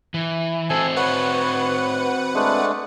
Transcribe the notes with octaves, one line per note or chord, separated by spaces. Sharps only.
E3
C4 F#4 A4 C5 G#5
B4 C#5 F#5
G#3 A3 D4